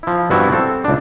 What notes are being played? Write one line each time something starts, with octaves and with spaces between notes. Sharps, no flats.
F3 E4
G2 B3 C4 E4 F#4
C4 A4
C#2 D4